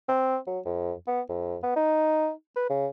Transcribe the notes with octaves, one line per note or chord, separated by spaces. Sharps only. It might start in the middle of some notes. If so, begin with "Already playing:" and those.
C4
F#3
F2
B3
F2
B3
D#4
B4
C#3